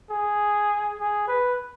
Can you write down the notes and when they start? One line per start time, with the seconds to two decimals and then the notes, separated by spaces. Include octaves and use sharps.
0.10 G#4
0.99 G#4
1.28 B4